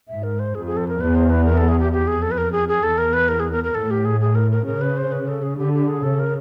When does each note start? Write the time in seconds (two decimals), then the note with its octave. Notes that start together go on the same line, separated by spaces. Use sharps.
0.08 G#2 E5
0.23 A#4
0.39 C5
0.55 F2 G#4
0.66 G#4
0.77 A4
0.88 A#4
1.00 E2 B4
1.15 C5
1.30 B4
1.45 A#4
1.57 A4
1.69 G#4
1.80 G4
1.91 F2 G4
2.08 G#4
2.22 A4
2.31 B4
2.38 A#4
2.52 G#4
2.69 G#4
2.83 E2 A4
2.98 A#4
3.13 B4
3.28 A#4
3.40 G#4
3.52 A#4
3.64 A#4
3.74 A2 A4
3.91 G4
4.05 G#4
4.21 G#4
4.35 A#4
4.51 A#4
4.66 C#3 A#4
4.81 B4
4.97 C5
5.12 B4
5.28 A4
5.43 G#4
5.58 D3 G4
5.74 G4
5.88 G#4
6.03 C#3 A4
6.19 A#4